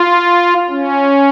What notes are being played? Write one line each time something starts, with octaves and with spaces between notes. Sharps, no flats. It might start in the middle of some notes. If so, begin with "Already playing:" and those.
Already playing: F4
C#4